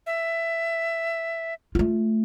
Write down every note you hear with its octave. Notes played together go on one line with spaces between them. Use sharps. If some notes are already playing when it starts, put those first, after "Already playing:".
E5
A3 F4